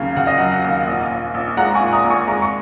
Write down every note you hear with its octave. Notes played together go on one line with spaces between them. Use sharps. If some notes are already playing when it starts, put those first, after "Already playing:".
Already playing: D#2 C#3 F#3
C#3 F#5
D#5
F#3 F#5
F#5
D#2
A#1 D#5
A#1
A#1
G#3 F#5 A#5
G#5 C#6
A#2
A#5 D#6
A#1
G#5 C#6
G#3 A#5
C#6